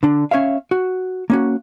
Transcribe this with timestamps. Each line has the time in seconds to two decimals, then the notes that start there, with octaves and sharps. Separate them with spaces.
0.03 D3 D4
0.31 C#4 C#5 E5 F5
0.71 F#4
1.30 A#3 C#4 F#4